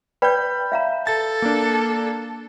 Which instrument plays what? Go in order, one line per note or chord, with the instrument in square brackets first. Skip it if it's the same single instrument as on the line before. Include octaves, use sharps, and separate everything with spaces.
[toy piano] B4 D5 G5 [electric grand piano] B5 G6
[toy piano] E5 F5 A#5
[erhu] A4 [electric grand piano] A6
[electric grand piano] A#3 D4